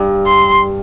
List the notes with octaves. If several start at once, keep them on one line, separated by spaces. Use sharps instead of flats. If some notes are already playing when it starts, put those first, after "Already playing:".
Already playing: G2
C6